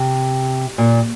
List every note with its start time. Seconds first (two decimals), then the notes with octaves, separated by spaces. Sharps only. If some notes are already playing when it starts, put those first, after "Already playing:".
Already playing: C3
0.78 A#2